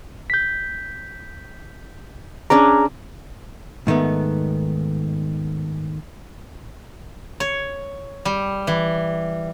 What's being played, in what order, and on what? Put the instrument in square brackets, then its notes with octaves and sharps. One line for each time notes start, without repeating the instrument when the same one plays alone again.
[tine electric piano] G6 B6
[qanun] C#4 D4 D5 [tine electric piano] G#4 A#5
[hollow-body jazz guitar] G#2 D#3 A3 B3
[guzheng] C#5
G3
E3